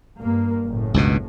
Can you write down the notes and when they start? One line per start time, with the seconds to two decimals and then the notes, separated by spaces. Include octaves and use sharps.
0.21 G2 A#3
0.65 F#1 A2
0.94 C#2 G2 B2